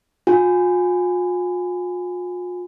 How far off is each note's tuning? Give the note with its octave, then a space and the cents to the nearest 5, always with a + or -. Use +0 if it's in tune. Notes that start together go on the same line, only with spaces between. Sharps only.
F4 +45 G#5 -10